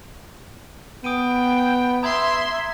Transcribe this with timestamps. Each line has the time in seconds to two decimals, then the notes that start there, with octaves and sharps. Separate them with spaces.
1.04 B3 G5 D#6 D7 D#7
2.03 E5 A#5 C6 D#6 G#6